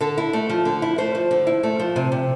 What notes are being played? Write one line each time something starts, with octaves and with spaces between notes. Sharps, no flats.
D3 A4
E4
A3
F3
D3
E4
A3 C5
F3
D3
E4
A3
F3
C3
C3